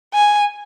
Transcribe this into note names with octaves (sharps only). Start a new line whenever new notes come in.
G#5